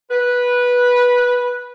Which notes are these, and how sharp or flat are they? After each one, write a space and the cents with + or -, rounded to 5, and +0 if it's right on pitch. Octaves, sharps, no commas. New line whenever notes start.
B4 -10